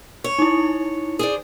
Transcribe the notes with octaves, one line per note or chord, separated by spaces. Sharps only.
C#5
D#4 E4
G#4 C5 D5